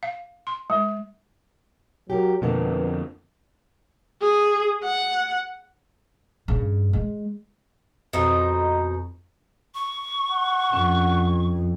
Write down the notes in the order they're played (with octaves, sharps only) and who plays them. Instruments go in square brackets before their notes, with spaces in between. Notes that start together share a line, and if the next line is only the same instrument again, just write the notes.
[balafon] F5
C6
G#3
[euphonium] F#3 [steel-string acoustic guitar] G4 A4 A#4
[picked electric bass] F2 D3 [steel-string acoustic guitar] B2 A#3 C4 [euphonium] B4
[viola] G#4
F#5
[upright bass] G2 C#3
G#3
[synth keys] F2 [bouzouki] B2 D#4 C5
[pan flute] C#6
[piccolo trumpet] F#5
[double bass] F2 [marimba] C#4